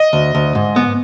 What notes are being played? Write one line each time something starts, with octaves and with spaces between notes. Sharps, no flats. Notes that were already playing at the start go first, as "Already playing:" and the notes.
Already playing: D#5
D2
D2
G#2
B3